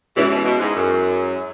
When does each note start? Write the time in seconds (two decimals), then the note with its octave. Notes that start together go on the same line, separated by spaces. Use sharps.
0.16 B2 E3 G#3 C#4 E4 G#4
0.30 B2 E3
0.45 B2
0.60 G#2
0.75 F#2